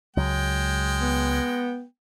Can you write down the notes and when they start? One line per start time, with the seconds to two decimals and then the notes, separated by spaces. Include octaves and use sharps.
0.17 C#2 F#3 G#3 G5
1.01 B3